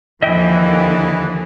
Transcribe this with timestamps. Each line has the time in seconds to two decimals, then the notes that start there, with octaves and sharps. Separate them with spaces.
0.22 D#2 D3 E3 F3 D#5 E5 G5